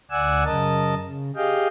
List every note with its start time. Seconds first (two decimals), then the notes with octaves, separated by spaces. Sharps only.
0.11 D2 D5 F#5 G#5 E6
0.45 F#2 C#3 A#4 D#5 A5
1.03 C#3
1.36 G4 G#4 D#5 F5 G5